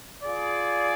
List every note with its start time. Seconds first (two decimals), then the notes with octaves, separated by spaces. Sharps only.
0.23 F4 G#4 D5